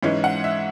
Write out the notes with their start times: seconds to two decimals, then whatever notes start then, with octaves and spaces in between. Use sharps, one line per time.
0.03 G#2 E3 G#3 C#4
0.24 F#5
0.44 E5